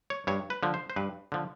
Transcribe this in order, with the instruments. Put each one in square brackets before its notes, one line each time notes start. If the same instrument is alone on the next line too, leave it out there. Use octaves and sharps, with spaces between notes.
[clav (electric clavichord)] C#5
G2 C#5
B4
D3 F3
C5
C5
G2 B4
D3 F3